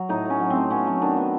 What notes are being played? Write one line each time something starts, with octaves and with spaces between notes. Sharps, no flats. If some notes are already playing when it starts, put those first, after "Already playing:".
Already playing: F#3
A2 D#4
A3 C#4
F#3
A3 C4
B3 C#4
F#3
D#3 D4
B3